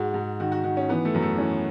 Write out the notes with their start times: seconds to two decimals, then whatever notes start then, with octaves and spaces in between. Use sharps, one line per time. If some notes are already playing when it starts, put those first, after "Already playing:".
Already playing: G#2 F#4
0.14 G#2
0.40 D#3 F#4
0.52 F#4
0.64 D#3 F#4
0.77 C#4
0.89 E3 B3
1.05 A3
1.14 F#2
1.22 A3
1.38 E3 C#4